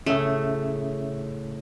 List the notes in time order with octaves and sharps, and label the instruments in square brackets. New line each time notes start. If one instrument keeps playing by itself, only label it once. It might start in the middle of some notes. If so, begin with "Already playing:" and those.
[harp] A2 C#3 [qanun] A3 [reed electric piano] C#4 E5